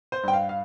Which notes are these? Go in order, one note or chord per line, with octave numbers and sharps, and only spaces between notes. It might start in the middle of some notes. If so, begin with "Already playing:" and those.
C5
G2 G5
F5
F5